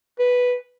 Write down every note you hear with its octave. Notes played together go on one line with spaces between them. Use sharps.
B4